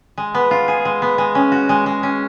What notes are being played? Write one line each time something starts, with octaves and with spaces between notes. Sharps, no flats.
G#3
B3
F4
G#4
G#3
B3
G#3
C#4
F#4
G#3
G#3
C#4